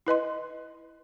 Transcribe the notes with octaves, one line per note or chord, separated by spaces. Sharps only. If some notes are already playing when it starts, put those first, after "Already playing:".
E4 B4 D#5 C6